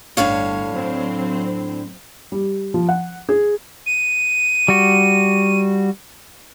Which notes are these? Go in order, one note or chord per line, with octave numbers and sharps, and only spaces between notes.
G1 D2 A2 D3 C#5 F5
F#3 C4 C5
G3
F3
F#5
G#4
D#7
G3 F#4